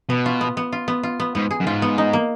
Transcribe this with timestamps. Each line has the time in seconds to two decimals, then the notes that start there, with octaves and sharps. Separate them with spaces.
0.09 B2 B3
0.26 F4
0.41 B3
0.57 B3
0.72 F4
0.88 B3
1.03 F4
1.20 B3
1.35 G#2 B3
1.51 G#4
1.60 F#2
1.66 G#2 F4
1.82 B3
1.98 D#4
2.13 A#3